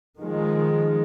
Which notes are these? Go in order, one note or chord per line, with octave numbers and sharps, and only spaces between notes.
D#3 F3 G#3